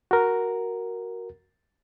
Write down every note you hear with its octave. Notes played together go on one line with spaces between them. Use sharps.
F#4 A#4